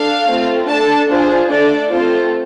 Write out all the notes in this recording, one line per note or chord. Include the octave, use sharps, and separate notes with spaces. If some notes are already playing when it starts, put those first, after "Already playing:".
Already playing: D4 A4 F5
A3 C4 F4
D4 A4 A5
D4 F4 G#4 C5
A3 D4 A4 D5
A3 C4 F4 A4 C5